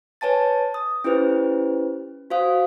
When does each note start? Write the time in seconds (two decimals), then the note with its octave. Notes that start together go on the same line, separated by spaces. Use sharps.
0.21 B4 C#5 G#5 A5 A6
0.74 D#6
1.04 C#4 E4 G4 B4 C5
2.30 F#4 C5 F5 D#6